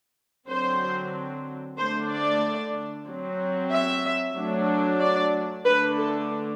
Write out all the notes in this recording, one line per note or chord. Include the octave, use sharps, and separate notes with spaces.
D3 F#3 C4 C5
D3 A3 D4 C5
D5
F#3 C4
E5
F#3 A3 D4
D5
D3 A3 D4 B4
A4